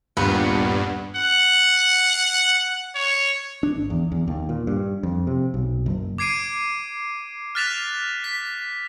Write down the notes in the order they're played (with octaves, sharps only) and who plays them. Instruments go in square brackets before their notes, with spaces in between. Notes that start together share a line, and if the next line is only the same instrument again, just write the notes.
[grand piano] D#1 F4 [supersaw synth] G2 [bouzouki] B3
[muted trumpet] F#5
C#5
[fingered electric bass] D4
G#1
E2
E2
D#2
A#2
G2
F2
C3
B1
F#1
[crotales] D6 G#6 C7 D7 D#7
F6 F#6 A6 B6 E7 F7
B6